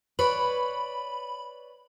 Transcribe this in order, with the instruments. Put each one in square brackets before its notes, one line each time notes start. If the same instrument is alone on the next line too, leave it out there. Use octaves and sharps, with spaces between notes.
[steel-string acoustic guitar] B4 C#5 D5 [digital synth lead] B5